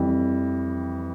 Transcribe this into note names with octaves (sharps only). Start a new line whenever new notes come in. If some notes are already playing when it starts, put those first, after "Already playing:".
Already playing: F2 E3 G3